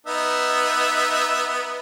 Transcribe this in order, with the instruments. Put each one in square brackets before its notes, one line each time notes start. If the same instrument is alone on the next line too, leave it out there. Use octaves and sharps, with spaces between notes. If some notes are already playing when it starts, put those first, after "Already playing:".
[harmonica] B3 D#4 E5